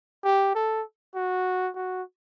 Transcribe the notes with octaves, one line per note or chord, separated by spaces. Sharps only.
G4
A4
F#4
F#4